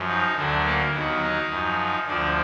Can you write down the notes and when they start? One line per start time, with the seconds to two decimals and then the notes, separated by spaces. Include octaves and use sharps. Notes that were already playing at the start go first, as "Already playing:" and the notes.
Already playing: F#2 F3
0.08 D#4
0.37 D2 D3 F#3 D4
0.65 A#3
0.94 D#2 D#3 F#3 B3
1.22 D#4
1.50 F#2 F3
2.07 D2 D3 F3 D4